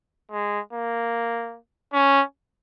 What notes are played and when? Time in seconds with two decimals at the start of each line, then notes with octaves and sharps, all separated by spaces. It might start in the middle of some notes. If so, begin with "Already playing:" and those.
0.31 G#3
0.73 A#3
1.93 C#4